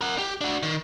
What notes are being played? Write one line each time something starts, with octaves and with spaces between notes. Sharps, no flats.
A#4 F#5
G4
D4 F#4
D#3